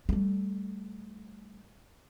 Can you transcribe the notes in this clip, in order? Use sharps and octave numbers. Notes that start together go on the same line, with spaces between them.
G3 A3